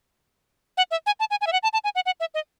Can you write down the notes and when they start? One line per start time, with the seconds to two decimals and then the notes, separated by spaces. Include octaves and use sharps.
0.77 F#5
0.91 E5
1.06 G#5
1.20 A5
1.31 G#5
1.41 G#5
1.47 E5
1.53 F#5
1.63 A5
1.73 A5
1.84 G#5
1.95 F#5
2.06 F#5
2.20 E5
2.34 D#5